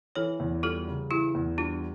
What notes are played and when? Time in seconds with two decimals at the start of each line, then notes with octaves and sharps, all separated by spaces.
0.16 E3 A4 C#5
0.40 E2
0.63 G3 F4 A4
0.88 C#3
1.11 E3 E4 G4
1.35 E2
1.58 G3 D4 F4